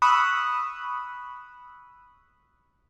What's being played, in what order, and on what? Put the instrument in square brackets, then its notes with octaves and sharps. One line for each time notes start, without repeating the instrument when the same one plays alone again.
[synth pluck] B5 C#6 D#6 E6 F#6